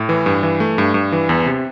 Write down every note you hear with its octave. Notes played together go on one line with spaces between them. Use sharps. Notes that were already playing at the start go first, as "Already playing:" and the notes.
Already playing: A2
E3
G2
E3
A3
G2
G2
E3
E2
C3